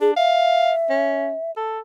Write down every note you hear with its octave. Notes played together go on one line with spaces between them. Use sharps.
D4 G#4
E5 F5
C#4
A4